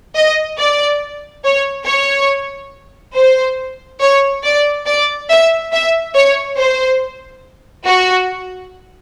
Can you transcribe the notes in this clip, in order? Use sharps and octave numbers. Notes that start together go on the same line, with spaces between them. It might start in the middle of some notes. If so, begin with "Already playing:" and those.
D#5
D5
C#5
C#5
C5
C#5
D5
D5
E5
E5
C#5
C5
F#4